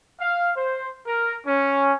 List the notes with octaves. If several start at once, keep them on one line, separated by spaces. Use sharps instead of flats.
F5
C5
A#4
C#4